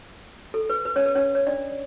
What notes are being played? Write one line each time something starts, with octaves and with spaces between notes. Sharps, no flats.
A4
B4
B4
C#4 C#5
B4
C#4 C#5
C#5
D4 D5